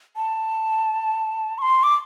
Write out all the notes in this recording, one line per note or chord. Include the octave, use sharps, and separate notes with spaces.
A5
C#6
C6
D6